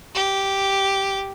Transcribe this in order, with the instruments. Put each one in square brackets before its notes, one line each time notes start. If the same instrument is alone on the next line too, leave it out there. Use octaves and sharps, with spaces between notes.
[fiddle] G4